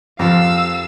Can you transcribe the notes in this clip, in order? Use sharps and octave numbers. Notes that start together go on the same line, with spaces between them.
F2 F3 G3 A#4 F5 E6